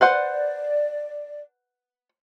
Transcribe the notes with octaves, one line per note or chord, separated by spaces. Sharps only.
B4 C5 D5 F#5